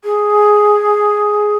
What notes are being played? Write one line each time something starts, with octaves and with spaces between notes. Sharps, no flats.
G#4